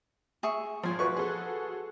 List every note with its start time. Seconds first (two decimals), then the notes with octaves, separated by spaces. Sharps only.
0.43 G#4 E5 C#6
0.83 G#1 F3 F4 C5 G#5
0.99 F#4 B4 C#6
1.17 G#4 A4